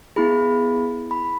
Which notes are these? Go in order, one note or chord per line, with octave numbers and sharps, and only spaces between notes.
B3 E4 G#4 B5
B5